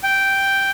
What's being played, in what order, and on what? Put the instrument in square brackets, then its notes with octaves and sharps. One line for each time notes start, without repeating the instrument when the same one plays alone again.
[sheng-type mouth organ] G5